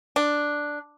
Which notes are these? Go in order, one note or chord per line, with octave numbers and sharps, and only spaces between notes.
D4